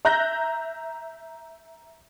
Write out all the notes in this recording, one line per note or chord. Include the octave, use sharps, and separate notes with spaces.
E5 A#5 F#6 G6 A#6